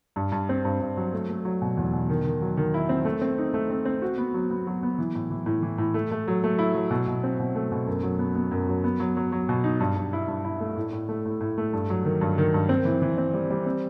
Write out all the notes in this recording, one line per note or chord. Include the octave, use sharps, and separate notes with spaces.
G2
G2
C4
G2
G2
F#3
A3
A3
F#3
B2
E2
B2
D#3
D#3
F#3
D#3
E4
C4
A3
C4
D#4
A3
C4
C4
F#4
B3
F#3
B3
F#3
B3
E3
A2
E3
A2
E3
A2
A3
A3
F#3
A3
E4
F#3
B2
B2
C4
B2
A3
B2
F#2
F#3
B3
B3
F#2
F#3
B3
F#3
F#3
F#3
B2
D#4
G2
G2
E4
G2
E4
A3
A2
A2
A3
A2
A2
A3
G2
F#3
D#3
G2
D#3
G2
C4
E3
E3
C4
G3
G3
C4